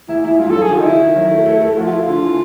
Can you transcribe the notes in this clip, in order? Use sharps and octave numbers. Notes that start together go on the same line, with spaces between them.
E2 E4
E2 E4
G2 F4
F#3 A4
G#4
D#3 F4
D#4
D#3 E4
D#3
F#3
A3
A3
A3
F3 F#4
F4
A3 E4
F4
D3
E3